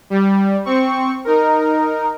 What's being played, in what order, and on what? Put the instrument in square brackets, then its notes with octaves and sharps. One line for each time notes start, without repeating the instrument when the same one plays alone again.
[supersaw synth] G3
C4 C#6
D#4 A#4